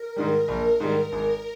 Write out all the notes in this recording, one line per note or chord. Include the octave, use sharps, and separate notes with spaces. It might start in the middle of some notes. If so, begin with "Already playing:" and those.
Already playing: A#4
G#2 D#3 G3 A#4
A#1
G#2 D#3 G3
G#1